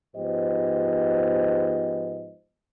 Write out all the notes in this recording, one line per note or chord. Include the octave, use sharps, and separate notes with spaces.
G#2 F3 B3 G4 C5 D#5